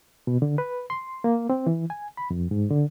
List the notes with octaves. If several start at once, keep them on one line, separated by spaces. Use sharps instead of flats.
B2
D3
B4
C6
A#3
C4
E3
G#5
B5
F2
G#2
D3